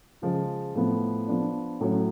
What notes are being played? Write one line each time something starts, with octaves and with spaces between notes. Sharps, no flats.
C#3 F3 G#3
A2 F3 B3
F3 B3 D4
A2 F#3 C#4